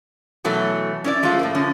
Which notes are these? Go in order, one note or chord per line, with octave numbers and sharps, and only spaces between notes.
B2 E3 F#3 A3
C#4 E4 D5
F3 G#3 A3 C#4 F4
A2 A3 A#3
D3 F3 C#4